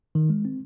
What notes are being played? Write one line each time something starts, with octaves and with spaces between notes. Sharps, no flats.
D#3
G#3
C4